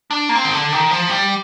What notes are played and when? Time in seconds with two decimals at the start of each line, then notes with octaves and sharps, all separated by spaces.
0.11 D4
0.29 A#3
0.35 C4
0.45 D#3
0.54 D3
0.72 D#3
0.91 F3
1.10 G3